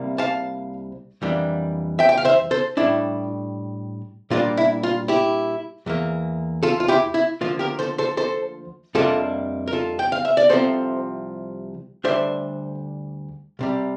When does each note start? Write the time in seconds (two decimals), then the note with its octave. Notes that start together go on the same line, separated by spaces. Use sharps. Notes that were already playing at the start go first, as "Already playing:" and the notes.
Already playing: C2 C3 G3 A#3
0.18 F5 A5
1.22 F2 E3 G3 A#3 D4
1.99 E5 G5
2.09 G5
2.17 F5
2.25 C5 E5
2.51 A4 C5
2.77 A2 G3 D4 E4
4.30 A#2 G3 A#3 D4 F4
4.57 E4
4.83 F4
5.08 E4 G4
5.86 E2 E3 A#3
6.63 F4 A4
6.80 F4
6.88 E4 G4
7.14 E4
7.41 D2 D3 F3 A#3 F4
7.59 G4 A#4
7.79 A4 C5
7.98 A4 C5
8.17 A4 C5
8.95 F2 C3 G3 A#3 D4 F4 A4
9.68 A#4
9.73 F4 A4
9.99 G5
10.12 F5
10.25 E5
10.37 D5
10.49 C2 C3 F3 C4 A4 C5
12.04 D2 D3 G3 D4 C5 E5
13.59 C2 C3 G3